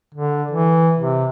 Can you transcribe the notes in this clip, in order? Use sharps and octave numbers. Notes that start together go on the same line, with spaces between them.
D3
E3
C3